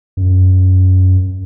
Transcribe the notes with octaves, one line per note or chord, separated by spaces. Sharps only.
F#2